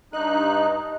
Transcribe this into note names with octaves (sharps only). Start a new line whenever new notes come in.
G2 D#4 D#5 D#6 F#6